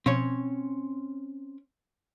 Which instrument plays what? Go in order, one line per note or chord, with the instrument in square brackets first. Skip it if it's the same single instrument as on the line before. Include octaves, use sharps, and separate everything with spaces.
[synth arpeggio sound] B2 F3 [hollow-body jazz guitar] C4 C#4 C#5